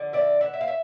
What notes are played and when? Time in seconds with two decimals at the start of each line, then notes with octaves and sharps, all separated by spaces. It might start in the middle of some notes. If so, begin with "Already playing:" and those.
Already playing: D3 F3
0.13 D5 E5
0.41 E5 F#5
0.53 E5
0.61 F5
0.68 E5